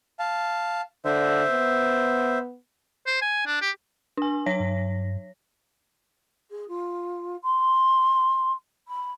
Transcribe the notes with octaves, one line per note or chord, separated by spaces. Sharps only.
F5 A5
D3 C5 E5
B3
C5
G#5
D4
G4
D4 G#5
F#3 C#5 A#6
G2
G#4
F4
C6
B5